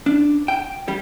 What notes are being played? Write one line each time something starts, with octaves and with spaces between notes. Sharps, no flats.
D4
G5
G3